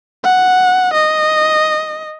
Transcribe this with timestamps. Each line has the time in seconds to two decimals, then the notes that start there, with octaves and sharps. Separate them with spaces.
0.24 F#5
0.94 D#5